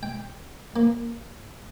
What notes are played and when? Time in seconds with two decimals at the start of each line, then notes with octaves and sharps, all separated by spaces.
0.03 G5
0.76 A#3